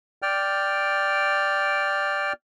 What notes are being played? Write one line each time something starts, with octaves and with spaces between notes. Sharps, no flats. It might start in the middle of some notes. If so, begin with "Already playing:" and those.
D5 G5 F6